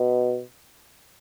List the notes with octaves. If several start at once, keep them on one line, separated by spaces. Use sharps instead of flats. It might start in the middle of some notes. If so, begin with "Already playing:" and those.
Already playing: B2